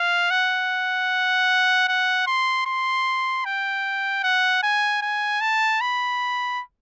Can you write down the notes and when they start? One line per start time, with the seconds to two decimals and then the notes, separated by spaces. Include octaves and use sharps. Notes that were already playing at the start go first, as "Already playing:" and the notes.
Already playing: F5
0.31 F#5
1.88 F#5
2.27 C6
2.66 C6
3.45 G5
4.23 F#5
4.63 G#5
5.02 G#5
5.41 A5
5.81 B5